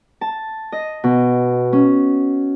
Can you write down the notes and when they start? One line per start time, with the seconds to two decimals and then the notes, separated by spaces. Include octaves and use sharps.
0.21 A5
0.72 D#5
1.04 B2
1.73 C#4